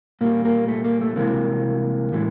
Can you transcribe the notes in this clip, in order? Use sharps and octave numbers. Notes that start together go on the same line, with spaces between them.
A#2 G3 A#3
A#3
A3
A#3
A3
C2 C3 E3 G#3 A#3
A2 E3 G#3